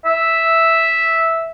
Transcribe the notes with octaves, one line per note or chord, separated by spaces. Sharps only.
E5